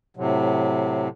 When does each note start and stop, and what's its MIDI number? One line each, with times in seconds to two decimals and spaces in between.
0.17 1.09 45
0.17 1.09 48
0.17 1.09 54